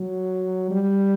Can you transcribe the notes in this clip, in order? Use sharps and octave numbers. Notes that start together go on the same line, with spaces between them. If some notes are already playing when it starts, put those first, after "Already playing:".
Already playing: F#3
G3